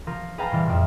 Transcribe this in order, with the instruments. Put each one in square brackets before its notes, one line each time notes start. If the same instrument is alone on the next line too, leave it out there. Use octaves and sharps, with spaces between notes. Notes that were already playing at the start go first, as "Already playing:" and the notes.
[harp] F3 A#4
G#4 B4 F5 G5 A5 A#5
A#2 E3 G3
F2 A#2